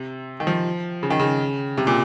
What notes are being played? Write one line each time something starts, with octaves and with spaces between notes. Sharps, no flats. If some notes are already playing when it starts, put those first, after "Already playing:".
Already playing: C3
D#3
F3
C#3
D#3
C#3
C3
A#2